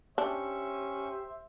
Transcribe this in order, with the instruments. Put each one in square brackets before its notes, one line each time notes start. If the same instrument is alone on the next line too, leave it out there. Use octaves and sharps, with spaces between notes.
[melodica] C#4 C#6 [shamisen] D4 [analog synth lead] G4 [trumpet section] C5 E5